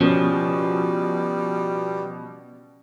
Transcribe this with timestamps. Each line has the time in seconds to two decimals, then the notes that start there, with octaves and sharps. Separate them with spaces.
0.01 B2 F3 G3 C#4